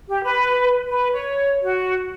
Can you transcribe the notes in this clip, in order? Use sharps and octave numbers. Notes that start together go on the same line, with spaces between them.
G4
B4
B4
C#5
F#4